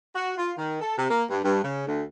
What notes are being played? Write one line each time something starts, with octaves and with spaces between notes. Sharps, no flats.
F#4
F4
D#3
A4
C3
A#3
G2
G2
C#3
D2